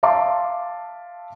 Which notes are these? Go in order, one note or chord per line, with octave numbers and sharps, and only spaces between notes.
E5 F5 A5 C6 D6